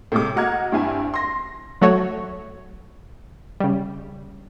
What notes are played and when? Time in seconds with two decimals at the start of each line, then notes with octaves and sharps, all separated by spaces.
0.12 A2 C3 G#3 D6
0.36 F#4 D#5 F#5 A#5 F6 G#6
0.72 G2 C4 E4 G#5
1.14 C6 A#6
1.81 F#3 A3 F#4 C#5
3.60 C#3 G3